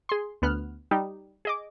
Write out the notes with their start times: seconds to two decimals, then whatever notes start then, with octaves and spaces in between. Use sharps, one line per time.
0.09 G#4 C6
0.42 D2 B3 F6 F#6
0.91 G3 D#4
1.45 G#4 D#5 D6